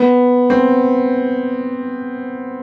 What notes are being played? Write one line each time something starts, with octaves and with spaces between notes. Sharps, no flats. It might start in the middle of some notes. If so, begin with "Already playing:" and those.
Already playing: B3
C4